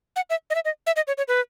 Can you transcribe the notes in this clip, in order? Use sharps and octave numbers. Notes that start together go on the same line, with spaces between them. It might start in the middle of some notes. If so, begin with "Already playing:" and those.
F#5
E5
D#5
E5
D#5
E5
D#5
C#5
C#5
B4